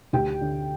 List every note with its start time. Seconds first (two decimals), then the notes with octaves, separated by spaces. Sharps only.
0.13 D2 G4 G5
0.41 D3